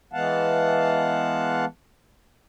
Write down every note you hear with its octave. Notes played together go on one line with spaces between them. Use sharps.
E3 G#3 B3 F5 F#5 A5